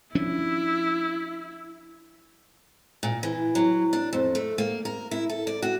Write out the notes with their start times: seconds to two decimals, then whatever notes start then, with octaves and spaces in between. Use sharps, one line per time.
0.15 F3 C#4 D4 E4
3.03 A#2
3.23 E3
3.55 F#3
3.93 D4
4.13 F2
4.35 A3
4.58 A#3
4.85 A#4
5.11 E4
5.29 A4
5.47 D5
5.62 F#4